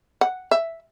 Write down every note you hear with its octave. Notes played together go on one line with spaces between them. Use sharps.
F#5
E5